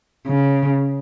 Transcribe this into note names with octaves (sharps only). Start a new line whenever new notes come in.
C#3